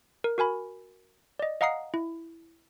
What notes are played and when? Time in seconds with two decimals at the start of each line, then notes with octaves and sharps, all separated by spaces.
0.24 A#4
0.38 F#4 A#4 G#5 B5
1.39 D5 D#5
1.61 D#5 F5 F#5 A#5 D#6 C7
1.94 E4